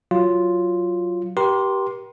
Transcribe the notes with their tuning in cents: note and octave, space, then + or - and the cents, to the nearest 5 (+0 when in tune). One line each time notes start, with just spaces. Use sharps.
F#3 +0 F4 +0
G4 -15 A#4 +45 C6 +0